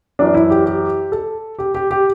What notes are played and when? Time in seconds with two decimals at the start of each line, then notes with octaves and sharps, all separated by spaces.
0.19 F#2 E3 D4
0.34 E4
0.50 G4
0.66 G4
1.12 A4
1.59 G4
1.75 G4
1.91 G4